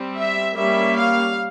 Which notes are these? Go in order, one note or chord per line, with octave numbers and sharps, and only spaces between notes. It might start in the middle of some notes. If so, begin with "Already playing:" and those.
Already playing: G3 C4
E5
G3 A#3 C#4 E5
F5